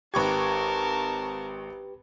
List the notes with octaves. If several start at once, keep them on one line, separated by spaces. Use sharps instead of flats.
G#1 G4 A#4 B4 A5 C#6 G#6